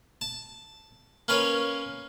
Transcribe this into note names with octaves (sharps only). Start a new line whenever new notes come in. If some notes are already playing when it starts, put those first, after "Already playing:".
A5
A#3 C#4 B4 C#5